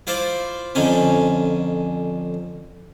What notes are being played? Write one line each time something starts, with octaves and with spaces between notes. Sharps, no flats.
E4 F4 C5 D5
F2 D3 C#4 D#4